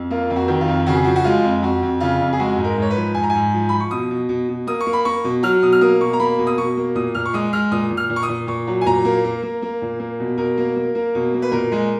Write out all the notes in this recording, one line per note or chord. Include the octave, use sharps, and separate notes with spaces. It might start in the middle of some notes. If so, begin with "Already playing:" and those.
Already playing: F2
A#3 F4
F2
F#4
D#3
F4
F2
C#3 F#4
G#4
F3 F#4
F#4
G#3 F4
F2
F2 F#4
F2
C#3 F4
F2
G#4
G#3 F#4
G#2
A#4
G#2 C#5
B4
F3
G#2 G#5
A#5
G#5
G#2
F3
F3 B5
C#6
B2 D#6
B2
B2
B2
A#3 D#6
C#6
A#3
B5
A#3 C#6
B2
F#3 F6
B2 D#6
F6
A#3 D#6
B2 C#6
A#5
A#3 B5
B2
D#6
B2 C#6
A#3
A#2 D#6
A#2 F6
C#6
G#3 D#6
G#3 F6
A#2 D#6
A#2
F6
A#2
C#6
D#6
A#2
A#2 C#6
F#3
G#5
A#2 A#5
A#3
A#3
A#3
A#3
A#2
A#3
B2
B2 A#4
A#3
A#3
A#3
B2
A#3
B4
A#2 A#4
G#3